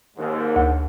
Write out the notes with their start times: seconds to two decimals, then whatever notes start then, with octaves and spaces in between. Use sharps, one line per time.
0.16 D#2 G#2
0.56 D2